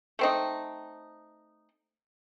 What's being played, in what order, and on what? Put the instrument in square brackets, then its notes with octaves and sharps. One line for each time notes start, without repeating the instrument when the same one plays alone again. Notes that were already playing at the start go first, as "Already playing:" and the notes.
[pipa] A3 C4 D#4